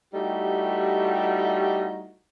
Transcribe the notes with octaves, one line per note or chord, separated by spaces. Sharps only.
G3 A3 D#4 E4 F#4 G4